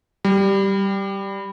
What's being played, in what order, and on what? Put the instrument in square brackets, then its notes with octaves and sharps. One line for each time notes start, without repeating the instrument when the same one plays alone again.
[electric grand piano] G3